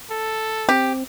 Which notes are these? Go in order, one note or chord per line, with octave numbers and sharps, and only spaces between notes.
A4
C4 G4